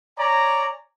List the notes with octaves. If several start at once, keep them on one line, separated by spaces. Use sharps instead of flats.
C#5 D5 G#5 A#5